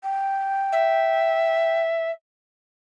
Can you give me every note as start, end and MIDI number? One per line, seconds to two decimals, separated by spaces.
0.03 1.81 79
0.72 2.11 76